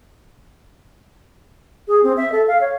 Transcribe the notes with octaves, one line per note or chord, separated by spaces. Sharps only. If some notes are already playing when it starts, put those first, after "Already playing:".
G#4
C4
E5
A4
F5
C#5